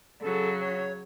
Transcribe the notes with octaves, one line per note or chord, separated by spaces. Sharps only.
C#3 F#3 A4
C#5